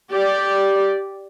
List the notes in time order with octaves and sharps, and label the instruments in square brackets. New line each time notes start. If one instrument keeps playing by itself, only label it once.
[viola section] G4 D5